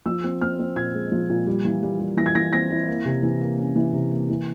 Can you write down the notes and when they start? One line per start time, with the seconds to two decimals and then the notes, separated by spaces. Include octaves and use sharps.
0.06 F3 E6
0.24 C4
0.41 C4 F6
0.59 C4
0.76 A#2 G#6
0.94 G#3
1.12 F3
1.30 A#2
1.47 G3
1.65 E3
1.83 G3
2.00 G3
2.17 E3 A#6
2.26 G#6
2.35 E3 A#6
2.53 C4 A#6
2.70 E4
2.88 A#3
3.05 C3
3.23 E3
3.41 A#3
3.58 C#4
3.76 E3
3.93 C3
4.11 A#3
4.30 E3